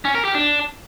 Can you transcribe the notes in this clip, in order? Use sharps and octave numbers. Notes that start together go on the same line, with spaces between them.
C#4
A#4
G4
D4